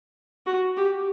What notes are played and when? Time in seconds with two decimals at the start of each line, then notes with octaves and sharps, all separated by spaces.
0.46 F#4
0.77 G4